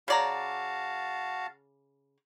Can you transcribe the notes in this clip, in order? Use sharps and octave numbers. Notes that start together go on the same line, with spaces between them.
C#3 F#4 D5 F5 A5 A#5